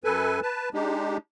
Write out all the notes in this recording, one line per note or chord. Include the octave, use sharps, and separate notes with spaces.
F#2 A4 B4 G#5
B4 A5
G#3 D4 D#4 G4